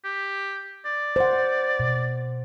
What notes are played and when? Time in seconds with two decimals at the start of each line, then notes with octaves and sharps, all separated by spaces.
0.04 G4
0.85 D5
1.16 C5 F#5
1.80 B2